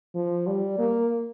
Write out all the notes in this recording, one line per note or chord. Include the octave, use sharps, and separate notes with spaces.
F3
G3
A#3